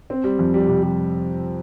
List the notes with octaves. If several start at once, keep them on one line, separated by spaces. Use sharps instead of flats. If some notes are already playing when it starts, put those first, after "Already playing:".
C4
G3
F2
G3
C3
G3